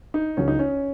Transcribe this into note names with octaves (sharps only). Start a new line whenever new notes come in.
D#4
C#2 C#3 F#3 C#4
D#4
C#4